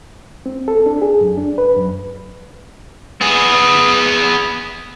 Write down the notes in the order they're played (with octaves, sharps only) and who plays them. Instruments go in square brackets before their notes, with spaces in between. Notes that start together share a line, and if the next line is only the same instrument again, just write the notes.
[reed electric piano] C4
A4
D4
G#4
F#2
D4
B4
F#2
[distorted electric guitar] B3 G#4